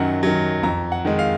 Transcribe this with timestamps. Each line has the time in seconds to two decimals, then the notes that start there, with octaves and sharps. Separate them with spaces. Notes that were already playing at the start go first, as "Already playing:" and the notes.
Already playing: F#2 D#3 F#3 F#5
0.23 D#3 F#3
0.63 F2 A#5
0.92 F#5
1.05 D#3 G#3
1.19 F5